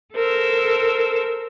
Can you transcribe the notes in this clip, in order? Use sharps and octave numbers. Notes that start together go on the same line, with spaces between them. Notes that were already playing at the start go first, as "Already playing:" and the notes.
A4 A#4 C5 E6